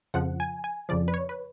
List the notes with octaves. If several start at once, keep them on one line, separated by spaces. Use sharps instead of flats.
F2 C#3 F3 F#5
G#5
G#5
F2 C#3 F3 D5
B4
C#5
B4